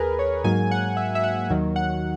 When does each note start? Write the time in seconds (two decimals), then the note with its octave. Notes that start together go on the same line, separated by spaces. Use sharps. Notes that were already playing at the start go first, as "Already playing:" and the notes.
Already playing: D#2 G#4 A#4 B4
0.19 C#5
0.44 G#2 F#3 A#3 G#5
0.71 F#5
0.97 E5
1.15 E5
1.24 F#5
1.50 D#2 D#3 F#3
1.76 F#5